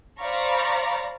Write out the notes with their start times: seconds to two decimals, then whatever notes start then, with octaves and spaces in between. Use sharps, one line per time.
0.21 C5 D5 F5 A#5 B5 C#6